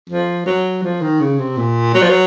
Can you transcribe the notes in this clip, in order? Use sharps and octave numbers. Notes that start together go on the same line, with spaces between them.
F3
F#3
F3
D#3
C#3
C3
A#2
F#3
F3
F#3